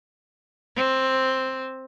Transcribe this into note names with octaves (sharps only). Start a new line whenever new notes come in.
C4